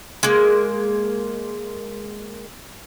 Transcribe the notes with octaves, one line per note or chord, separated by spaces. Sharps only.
G#3 A#3